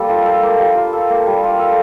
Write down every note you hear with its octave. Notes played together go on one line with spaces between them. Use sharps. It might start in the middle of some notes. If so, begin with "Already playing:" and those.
Already playing: G3 A#3 A4
F4
A4
A#3
G3
F4
A4
A#3
G3
F4
A4